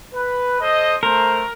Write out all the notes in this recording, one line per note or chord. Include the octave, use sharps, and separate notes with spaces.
B4
A4 C5 D#5
A3 A#4 C5